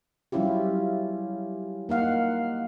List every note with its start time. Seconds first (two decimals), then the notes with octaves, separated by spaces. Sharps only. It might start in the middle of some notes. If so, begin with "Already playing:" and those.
0.32 F#3 G3 C#4 E4 F4 G4
1.89 A#3 D#4 F5 F#5